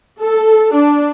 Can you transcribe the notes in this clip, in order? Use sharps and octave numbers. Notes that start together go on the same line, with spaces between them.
A4
D4